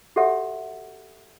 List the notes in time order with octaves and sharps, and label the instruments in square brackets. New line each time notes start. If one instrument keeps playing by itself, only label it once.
[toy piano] F#4 G4 A4 C#5 E5 F#5